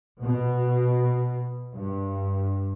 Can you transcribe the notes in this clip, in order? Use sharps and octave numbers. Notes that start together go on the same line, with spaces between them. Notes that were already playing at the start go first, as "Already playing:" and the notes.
B2
G2